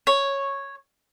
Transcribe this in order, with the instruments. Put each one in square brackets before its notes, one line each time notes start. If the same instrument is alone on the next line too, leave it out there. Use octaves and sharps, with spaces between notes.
[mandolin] C#5